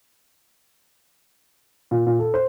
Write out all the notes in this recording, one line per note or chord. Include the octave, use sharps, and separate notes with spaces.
A#2
A#2
A4
C5